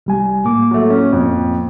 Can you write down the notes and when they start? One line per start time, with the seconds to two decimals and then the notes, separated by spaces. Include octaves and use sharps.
0.06 C2 G3 G#5
0.45 A2 A#3 D6
0.71 F#3 A3
0.90 C#4
1.13 F2